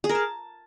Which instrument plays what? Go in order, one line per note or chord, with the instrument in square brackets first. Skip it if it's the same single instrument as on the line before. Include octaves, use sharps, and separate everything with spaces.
[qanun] G#4
A#4
A5